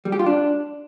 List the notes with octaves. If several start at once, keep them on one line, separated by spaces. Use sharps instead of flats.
G3
G4
F4
D4